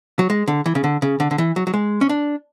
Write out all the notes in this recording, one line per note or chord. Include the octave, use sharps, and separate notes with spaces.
F#3
G#3
D3
E3
C#3
D3
C#3
D3
D3
E3
F#3
F#3
G#3
C#4
D4